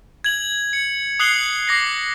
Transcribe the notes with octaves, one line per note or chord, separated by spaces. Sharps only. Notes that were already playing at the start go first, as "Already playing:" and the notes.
G#6 F#7
C#7
D#6 F#6 C7 F#7 G7
D6 A#6 C7